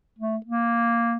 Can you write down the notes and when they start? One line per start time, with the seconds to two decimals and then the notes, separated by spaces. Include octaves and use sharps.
0.19 A3
0.46 A#3